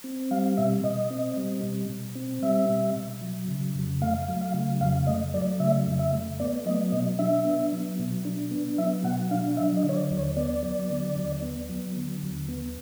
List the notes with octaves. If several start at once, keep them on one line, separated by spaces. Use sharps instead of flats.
C4
G3 F5
B2 E5
B2 D#5
C4
G3
B2
B2
C4
G3 E5
B2
B2
F#3
C#3
F2
A3 F5
F#3
F5
C#3
F2 F5
A3 D#5
F#3 D5
C#3 E5
F2
E5
A3
B3 D5
F#3 D#5
B2 D#5
D4 E5
B3
F#3
B2
D4
B3
F#3 E5
B2 F#5
D4 F5
F#3 E5
D#5
D3
C#5
D5
D#2
C#5
B3 D5
F#3
D3
D#2
B3
F#3
D3
D#2
B3